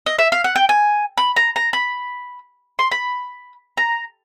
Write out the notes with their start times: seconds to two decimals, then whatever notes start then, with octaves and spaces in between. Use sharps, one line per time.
0.06 D#5
0.19 E5
0.32 F5
0.44 F#5
0.56 G5
0.69 G#5
1.18 B5
1.36 A#5
1.56 A#5
1.73 B5
2.79 C6
2.91 B5
3.78 A#5